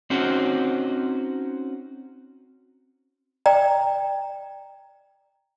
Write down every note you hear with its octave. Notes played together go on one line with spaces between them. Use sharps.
C4 C#4 D#4 F#4 C5
D5 G5 A#5